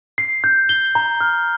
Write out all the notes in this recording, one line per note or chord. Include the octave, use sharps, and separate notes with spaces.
C7
G6
G7
A#5
F6